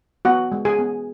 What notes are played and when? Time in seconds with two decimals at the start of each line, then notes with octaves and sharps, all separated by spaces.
0.25 B3 F#4 F#5
0.52 G#3
0.65 G#4 G#5
0.79 B3